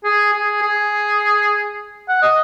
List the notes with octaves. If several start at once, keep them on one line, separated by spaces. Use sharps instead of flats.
G#4
G#4
G#4
F#5
D#5